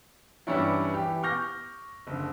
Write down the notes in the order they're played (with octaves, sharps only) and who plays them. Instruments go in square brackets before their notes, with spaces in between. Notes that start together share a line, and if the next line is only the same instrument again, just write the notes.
[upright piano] G2 E3 G3 C#4 D4 E4
E3 G4
C#6 D6 F6 G6 A#6
F#1 D3